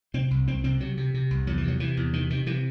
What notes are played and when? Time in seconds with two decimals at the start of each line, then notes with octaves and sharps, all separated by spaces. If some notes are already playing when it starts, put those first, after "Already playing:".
0.14 C3 C4
0.31 C2
0.48 C2 C4
0.64 C3 C4
0.80 C3 F#3
0.97 C3
1.14 C3
1.31 C2
1.47 E2 F#3
1.58 E3
1.64 C3 F#3
1.80 C3 E3
1.97 E2
2.13 C3 D#3
2.30 C3 D#3
2.46 C3 E3